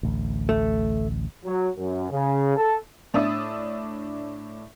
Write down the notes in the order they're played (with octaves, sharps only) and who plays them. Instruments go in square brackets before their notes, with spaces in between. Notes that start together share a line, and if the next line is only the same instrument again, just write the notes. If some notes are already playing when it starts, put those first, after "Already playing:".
[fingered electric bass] A1 D2
[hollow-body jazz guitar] A3
[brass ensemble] F#3
F#2
C#3
A4
[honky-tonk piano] A2 D4 E5 D#6 E6 A6